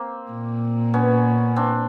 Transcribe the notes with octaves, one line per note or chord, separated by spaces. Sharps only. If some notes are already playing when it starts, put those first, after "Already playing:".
Already playing: A#3 C4
A#2
B3 C#4
C4 D4